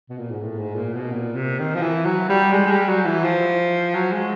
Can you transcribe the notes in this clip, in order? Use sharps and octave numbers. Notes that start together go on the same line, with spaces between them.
B2
A#2
G#2
A2
G#2
A#2
B2
A#2
C3
D#3
F3
E3
F#3
G3
G#3
G#3
G3
F#3
E3
F3
F#3
G#3